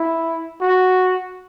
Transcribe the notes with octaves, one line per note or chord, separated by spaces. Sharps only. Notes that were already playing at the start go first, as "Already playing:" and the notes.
Already playing: E4
F#4